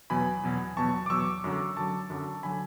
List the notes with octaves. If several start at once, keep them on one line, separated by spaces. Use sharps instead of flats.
E2 B2 F#3 G#5 B5
E2 B2 F#3
E2 B2 F#3 A5 C#6
D6
E2 B2 F#3 C#6 E6
F#2 D3 F#3
F#2 D3 F#3 A5 C#6
F#2 D3 F#3
D3 F#3 G#5 B5